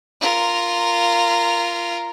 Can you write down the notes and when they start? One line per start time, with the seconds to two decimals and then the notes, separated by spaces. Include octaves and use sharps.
0.21 F4 A#4